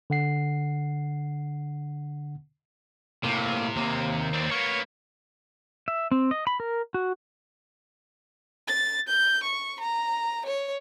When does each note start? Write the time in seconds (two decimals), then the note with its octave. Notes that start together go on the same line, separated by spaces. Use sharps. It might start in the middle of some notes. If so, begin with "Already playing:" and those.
0.10 D3 F#5 C7
3.23 A2 C3 A#3
3.76 D#2 A#3
4.33 C4 D4
4.51 A#3 B3 C#5
5.88 E5
6.11 C4
6.31 D#5
6.47 B5
6.60 A#4
6.94 F#4
8.67 A6
9.08 G6
9.43 C#6
9.80 A#5
10.46 C#5